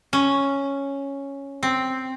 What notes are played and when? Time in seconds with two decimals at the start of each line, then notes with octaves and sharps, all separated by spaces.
0.13 C#4
1.63 C4